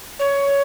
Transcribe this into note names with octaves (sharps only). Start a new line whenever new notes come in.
C#5